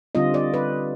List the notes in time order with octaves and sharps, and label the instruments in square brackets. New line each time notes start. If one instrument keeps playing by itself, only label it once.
[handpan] D3 G3 C4 F4 D#5
D5
B4